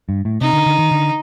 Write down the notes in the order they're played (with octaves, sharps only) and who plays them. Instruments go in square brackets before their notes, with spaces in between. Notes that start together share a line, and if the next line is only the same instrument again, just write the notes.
[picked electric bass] G2
A2
[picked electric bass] C3 [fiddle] D#4
[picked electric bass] D3
D3
D#3
D3